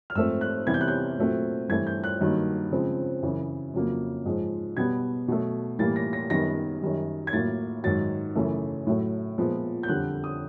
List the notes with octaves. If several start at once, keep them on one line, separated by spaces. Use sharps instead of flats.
F6
G#2 F3 A3 C4 E6
F#6
C3 E3 G3 B3 G#6
G6
F#6
G6
A#2 F#3 A3 C4
G2 E3 A3 C4 G#6
G6
F#6
G2 D#3 F#3 A#3
C#3 F3 G#3 C4
F#2 C#3 E3
F2 C#3 F#3 A#3
G#2 F3 G#3
B2 G3 B3 G#6
B2 F#3 A3
A2 E3 G3 A#3 A6
A#6
A#6
F#2 D#3 G3 B3 A#6
F#2 D#3 G3
G#6
A2 F#3 A#3 A6
G#2 D#3 F#3 A6
F#2 C#3 E3 A3
A2 F#3 A3
A#2 F3 G#3 B3
G6
F2 D3 G3 F#6
D#6